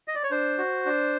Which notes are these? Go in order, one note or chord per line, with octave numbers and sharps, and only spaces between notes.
D#5
D5
C#5
D4 C5
F#4
D4